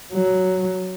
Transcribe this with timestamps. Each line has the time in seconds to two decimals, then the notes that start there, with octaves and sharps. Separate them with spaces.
0.13 F#3